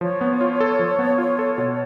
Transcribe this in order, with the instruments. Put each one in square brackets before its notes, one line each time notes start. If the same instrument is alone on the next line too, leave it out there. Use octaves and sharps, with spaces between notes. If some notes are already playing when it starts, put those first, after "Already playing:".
[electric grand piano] F3 [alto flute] C#5
[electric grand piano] B3
F4
A4
F3
B3
F4
A4
B2